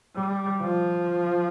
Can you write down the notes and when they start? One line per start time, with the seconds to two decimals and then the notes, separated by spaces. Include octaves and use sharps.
0.16 G3
0.62 F3